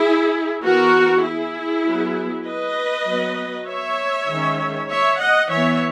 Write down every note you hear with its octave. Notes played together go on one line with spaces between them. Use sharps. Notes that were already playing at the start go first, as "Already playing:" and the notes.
Already playing: E4 G#4
E3 B3 F#4 A#4
E4 G#4
F#3 B3
B4 D#5
F#3 B3
C#5 E5
D#3 G#3 C#4
C#5 E5
D#5 F#5
E3 B3 C#5 E5